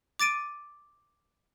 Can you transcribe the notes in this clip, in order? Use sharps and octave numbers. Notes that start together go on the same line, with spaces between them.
D6 A6 D7 D#7